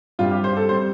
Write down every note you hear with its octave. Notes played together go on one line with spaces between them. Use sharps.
G2 G3 C4 F4
G4
C5
A4
G3 C4 C5